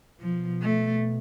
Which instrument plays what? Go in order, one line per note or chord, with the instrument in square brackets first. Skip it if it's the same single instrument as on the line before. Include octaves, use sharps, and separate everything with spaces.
[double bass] B2 [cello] F3
[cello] A3